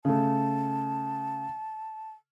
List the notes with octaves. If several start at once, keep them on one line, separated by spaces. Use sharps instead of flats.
C#3 A3 A5